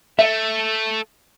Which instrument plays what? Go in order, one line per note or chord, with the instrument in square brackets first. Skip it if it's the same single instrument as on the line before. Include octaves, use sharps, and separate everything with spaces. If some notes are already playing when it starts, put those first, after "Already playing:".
[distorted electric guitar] A3 [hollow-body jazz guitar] E5